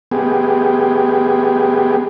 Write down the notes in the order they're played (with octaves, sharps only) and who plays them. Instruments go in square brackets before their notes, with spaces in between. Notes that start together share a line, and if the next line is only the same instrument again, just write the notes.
[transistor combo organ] B3 G4 G#4